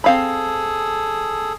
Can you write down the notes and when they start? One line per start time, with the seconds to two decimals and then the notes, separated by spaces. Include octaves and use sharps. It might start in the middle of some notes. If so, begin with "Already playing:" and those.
0.04 C4 G#4 A4 F5 B5